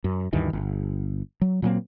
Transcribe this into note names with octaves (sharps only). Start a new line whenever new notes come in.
F#2
D2 G2 D#3 E3
G1
F#3
A#2 F#3 A#3 C4